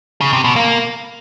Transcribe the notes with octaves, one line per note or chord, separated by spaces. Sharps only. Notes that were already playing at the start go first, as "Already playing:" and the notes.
C#3
C3
B2
A#3